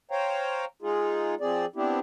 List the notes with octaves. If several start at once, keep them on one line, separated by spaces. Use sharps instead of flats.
C5 C#5 F5 G5 A#5
G#3 D#4 F4 G#4
F3 C4 G#4 D5
B3 C4 D4 E4 G4